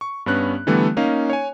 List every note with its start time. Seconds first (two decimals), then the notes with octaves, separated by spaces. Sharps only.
0.01 C#6
0.26 G2 B3 C#4 F#6
0.67 D3 E3 G3 A3 B3
0.97 A#3 C#4 D#4 F5
1.30 C#5 G#5